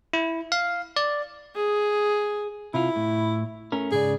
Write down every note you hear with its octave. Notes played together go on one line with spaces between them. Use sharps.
E4
F5
D5
G#4
C3 E4 F4
A2
A3 C#4 A#4
G#2 C#3 G#4 D5